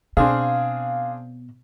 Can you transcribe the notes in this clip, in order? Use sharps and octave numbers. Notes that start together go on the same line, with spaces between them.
B2 C4 D4 G#4 F5